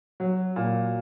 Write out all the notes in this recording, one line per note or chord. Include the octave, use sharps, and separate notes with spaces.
F#3
A#2